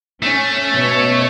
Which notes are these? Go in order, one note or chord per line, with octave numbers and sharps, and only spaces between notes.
A3 C#4
B2 C#5